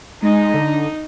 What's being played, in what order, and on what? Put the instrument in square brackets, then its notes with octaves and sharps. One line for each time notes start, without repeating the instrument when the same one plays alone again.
[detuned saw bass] G#3 [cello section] D#4
[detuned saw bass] D3